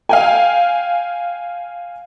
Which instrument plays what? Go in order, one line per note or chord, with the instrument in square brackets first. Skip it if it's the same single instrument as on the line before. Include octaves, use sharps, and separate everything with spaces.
[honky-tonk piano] F5 G5 G#5